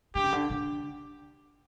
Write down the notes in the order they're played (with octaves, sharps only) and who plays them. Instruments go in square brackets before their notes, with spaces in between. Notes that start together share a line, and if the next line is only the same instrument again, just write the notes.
[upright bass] D3 [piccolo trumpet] G4
[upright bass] C#3
D3
D3